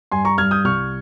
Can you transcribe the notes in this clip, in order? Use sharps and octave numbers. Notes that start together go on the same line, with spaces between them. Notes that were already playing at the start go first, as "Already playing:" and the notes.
G2 G#5 C6
A#5 C#6
G2 F6 G#6
D#6 G6
C2 C#6 F6